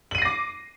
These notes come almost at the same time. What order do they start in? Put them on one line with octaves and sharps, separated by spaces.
F#7 D#7 C7 A#6 D6